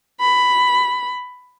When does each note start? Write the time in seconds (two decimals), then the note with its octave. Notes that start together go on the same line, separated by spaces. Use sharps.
0.20 B5